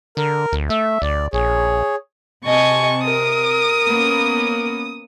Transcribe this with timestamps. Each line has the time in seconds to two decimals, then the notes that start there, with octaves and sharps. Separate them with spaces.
0.17 D3 A#4
0.53 D2
0.70 A3 E5
1.02 D2 D5
1.33 A#1 G#4 C#5
2.46 C3 D#5 G#5 A5 C#6
3.05 A#4 D#6
3.88 A#3 B3 C#4